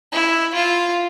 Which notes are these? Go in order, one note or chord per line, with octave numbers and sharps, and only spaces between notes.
E4
F4